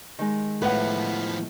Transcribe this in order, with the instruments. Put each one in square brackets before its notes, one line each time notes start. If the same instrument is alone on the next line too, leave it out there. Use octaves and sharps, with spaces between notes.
[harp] D#3 G#3
[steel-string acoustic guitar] A2 [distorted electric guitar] F3 B3 [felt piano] B4 F#5